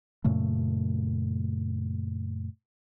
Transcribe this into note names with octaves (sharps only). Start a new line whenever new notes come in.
F#2 A#2 C#3 A3